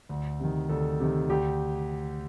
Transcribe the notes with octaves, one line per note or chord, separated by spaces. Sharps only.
D2
C3 D#3
D2 A4
C3 D#3
D2 G4